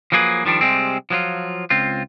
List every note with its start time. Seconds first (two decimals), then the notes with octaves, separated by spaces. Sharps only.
0.12 F3 F#3 A#3 G#4 B4
0.45 D#3 F3 G3 D4
0.61 C3 G3 G#3 C4
1.10 F3 F#3 F4
1.70 C#2 C4 F4